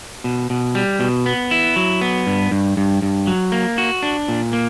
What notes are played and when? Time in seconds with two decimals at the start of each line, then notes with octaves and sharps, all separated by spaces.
0.24 B2
0.50 B2
0.75 G3
1.00 B2
1.26 B3
1.51 E4
1.76 F#3
2.01 B3
2.27 G2
2.51 G2
2.77 G2
3.02 G2
3.27 F#3
3.52 A#3
3.78 F#4
4.03 D4
4.28 A#2
4.53 A#3